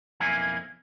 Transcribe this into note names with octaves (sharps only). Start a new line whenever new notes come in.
B1 F2 A#3 E4 G#5